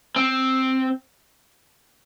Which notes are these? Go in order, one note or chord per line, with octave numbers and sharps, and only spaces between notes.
C4